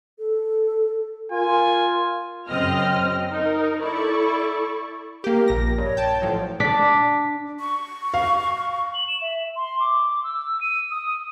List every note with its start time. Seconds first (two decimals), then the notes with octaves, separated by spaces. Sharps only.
0.19 A4
1.32 F4 A#4 G#5
2.47 F#2 C#3 F#3 C4 D#5 F6
3.31 D#4 A#4
3.81 E4 A4 D5 C#6
5.24 A#3 G4 A#4
5.48 A#1 A#6
5.78 G2 C#5
5.97 G5 A5
6.22 A1 F3 F#3
6.60 D4 D6 B6
7.60 C#6
8.14 F5
8.94 F#7
9.08 E7
9.22 E5
9.56 C6
9.80 D6
10.24 E6
10.61 D#7
10.91 D#6